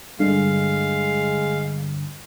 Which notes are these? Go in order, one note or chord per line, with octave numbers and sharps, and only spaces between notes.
G2 D3 G#3 F5